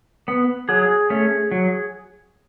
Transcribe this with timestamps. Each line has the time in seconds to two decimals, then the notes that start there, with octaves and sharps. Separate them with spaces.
0.28 B3
0.69 F#3 G#4
1.10 A3 C#4
1.51 F#3